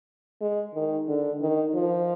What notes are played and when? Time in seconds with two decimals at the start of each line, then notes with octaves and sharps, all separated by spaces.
0.41 G#3
0.74 D#3
1.08 D3
1.42 D#3
1.75 F3